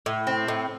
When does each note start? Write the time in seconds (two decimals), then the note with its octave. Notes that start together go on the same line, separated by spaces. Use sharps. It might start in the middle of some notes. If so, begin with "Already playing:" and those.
0.06 A2
0.27 C4
0.48 A2